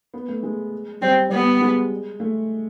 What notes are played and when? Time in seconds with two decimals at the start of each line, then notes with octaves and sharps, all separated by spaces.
0.14 B3
0.28 A3
0.43 G#3
1.02 G3 C4
1.29 G3 B3
1.61 G#3
2.20 A3